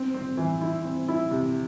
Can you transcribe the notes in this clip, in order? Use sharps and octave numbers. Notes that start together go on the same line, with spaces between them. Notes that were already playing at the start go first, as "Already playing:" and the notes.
Already playing: C4
C4
E3
E4
C4
E4
C3